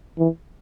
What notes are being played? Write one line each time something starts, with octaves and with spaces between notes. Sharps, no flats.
E3